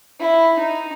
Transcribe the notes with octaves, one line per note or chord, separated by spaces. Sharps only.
E4
D#4